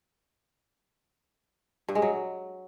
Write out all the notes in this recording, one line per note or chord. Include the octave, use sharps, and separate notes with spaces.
G2
G#3
F#3